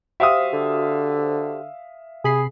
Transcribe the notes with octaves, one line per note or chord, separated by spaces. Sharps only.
F#4 G4 C5 E5 F5 D#6
D3
C3 G#4 B5 C7